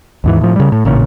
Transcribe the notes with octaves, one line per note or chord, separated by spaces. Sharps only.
D#2 G#2 E3
A2 F3
C#3 G3
A2
A1 A#2 C#3